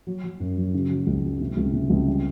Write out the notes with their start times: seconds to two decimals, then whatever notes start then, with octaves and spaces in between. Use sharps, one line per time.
0.07 F#3
0.24 F#3
0.40 F#2
0.57 F#3
0.74 C#3
0.90 F#3
1.07 C#2
1.23 F#3
1.40 C3
1.57 C#2
1.73 C3
1.90 C#2
2.07 G3